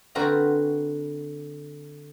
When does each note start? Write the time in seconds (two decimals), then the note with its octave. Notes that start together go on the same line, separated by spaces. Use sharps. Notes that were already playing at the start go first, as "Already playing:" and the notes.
0.15 D3 C4 F#4 A#4 B4 A#5